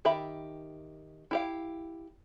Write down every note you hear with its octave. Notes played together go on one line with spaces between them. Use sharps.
D#3 G4 E5 B5
E4 G4 F5